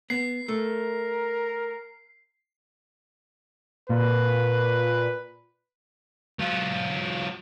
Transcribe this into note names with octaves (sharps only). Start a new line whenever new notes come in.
B3 C7
A3 A#4
A#2 B4
F#3 F4